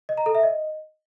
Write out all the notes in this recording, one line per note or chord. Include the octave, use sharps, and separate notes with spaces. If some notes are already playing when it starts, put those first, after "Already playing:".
D#5
A#5
A4
E5
D#5